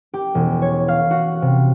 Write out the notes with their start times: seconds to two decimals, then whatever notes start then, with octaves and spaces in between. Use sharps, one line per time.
0.14 G4
0.35 E1
0.62 C#5
0.88 F5
1.11 F#4
1.42 C3